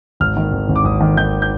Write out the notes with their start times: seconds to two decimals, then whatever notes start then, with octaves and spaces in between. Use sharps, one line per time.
0.20 G#1 F6
0.37 D#3
0.52 G#1
0.69 G#1
0.76 D6
0.84 G#1 D#6
1.00 D#3
1.17 D#3 G6
1.42 G6